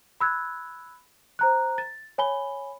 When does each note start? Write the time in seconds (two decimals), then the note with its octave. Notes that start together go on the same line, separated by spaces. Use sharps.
0.21 B5 E6 F#6 G#6
1.39 C5 A#5 F#6
1.78 A6
2.18 C#5 G#5 B5 G7